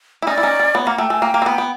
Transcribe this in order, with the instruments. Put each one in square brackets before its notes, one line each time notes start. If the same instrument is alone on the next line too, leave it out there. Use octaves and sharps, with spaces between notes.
[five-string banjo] E4
[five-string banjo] C#4 D#4 [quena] D5
[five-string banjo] E4
C#4 D#4
C#4
[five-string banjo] B3 [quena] C#5
[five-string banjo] A#3 [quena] F#5
[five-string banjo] A3 [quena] G5
[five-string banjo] A3 [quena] G#5
[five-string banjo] A#3 [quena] G5
[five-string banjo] A#3
C4
B3
B3